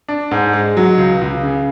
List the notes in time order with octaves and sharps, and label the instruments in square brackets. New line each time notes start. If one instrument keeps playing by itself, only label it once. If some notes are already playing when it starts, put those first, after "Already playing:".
[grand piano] D4
G#2
G#3
F#3
C#2
C#2
C#3